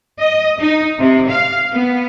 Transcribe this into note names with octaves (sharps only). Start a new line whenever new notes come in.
D#5
D#4
C3
F5
B3